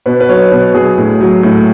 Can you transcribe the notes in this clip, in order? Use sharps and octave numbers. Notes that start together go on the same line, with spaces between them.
B2 B4
B4
F#3 C#5
B2 B4
F#3 G#4
A2
F#3
A2